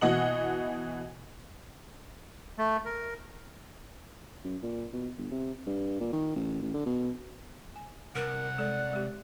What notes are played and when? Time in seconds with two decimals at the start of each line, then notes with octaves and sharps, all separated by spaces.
0.01 B2 E3 F#4 D#5 F#5 F#7
2.58 A3
2.85 A#4
4.44 F#2
4.62 A#2
4.93 B2
5.18 G1
5.31 C3
5.66 G2
6.00 A#2
6.13 D#3
6.36 A1
6.62 A1
6.74 D3
6.86 B2
7.76 G#5
8.15 C2 A#4 F#5
8.58 G#3 A4 D5
8.93 G#3 G4